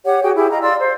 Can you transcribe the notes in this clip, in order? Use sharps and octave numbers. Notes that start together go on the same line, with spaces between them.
G4 C#5 F#5
F#4 G#4 G5
E4 G4 G#4
D#5 F5 A#5
D5 F5 C6 E6
C5